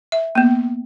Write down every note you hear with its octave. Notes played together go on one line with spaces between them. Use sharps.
E5
A#3 B3